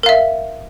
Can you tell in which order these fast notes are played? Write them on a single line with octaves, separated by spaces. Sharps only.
A#4 F5 E5